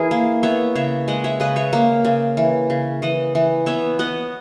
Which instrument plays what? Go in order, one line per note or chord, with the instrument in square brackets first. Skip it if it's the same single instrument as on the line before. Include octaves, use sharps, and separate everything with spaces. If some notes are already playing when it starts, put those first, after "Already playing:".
Already playing: [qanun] E3 E4 G#4 A#4
A#3
B3 C#5 E5
C#3 C#5 E5
G#3 D#5 F#5
C#5 E5
C#3 B4 D#5
C#5 E5
A#3
C#3
E3
C#3
E3 D#5 F#5
E3
B3 C#5 E5
B3 D#5 F#5